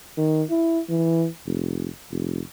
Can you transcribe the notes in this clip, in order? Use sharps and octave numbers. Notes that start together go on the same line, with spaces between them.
D#3
E4
E3
F1
F1